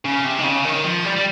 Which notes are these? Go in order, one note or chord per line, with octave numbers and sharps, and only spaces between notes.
C#3
C3
D#3
C#3
D#3
F3
G3
G3